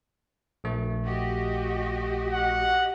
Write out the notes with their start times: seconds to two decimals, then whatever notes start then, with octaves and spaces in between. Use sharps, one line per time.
0.64 A#1 A3
1.05 F#4 G4 D#5
2.33 F#5